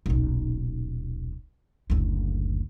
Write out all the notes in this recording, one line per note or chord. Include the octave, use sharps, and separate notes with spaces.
D#1 B1
F#1 D2